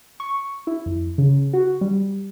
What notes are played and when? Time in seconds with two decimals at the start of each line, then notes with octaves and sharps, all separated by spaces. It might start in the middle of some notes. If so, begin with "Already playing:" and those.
0.20 C#6
0.67 E4
0.86 F2
1.18 C#3
1.53 F#4
1.81 G3